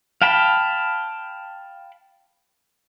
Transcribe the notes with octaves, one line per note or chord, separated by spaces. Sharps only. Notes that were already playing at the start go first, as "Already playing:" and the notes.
F5 G5 A5 B5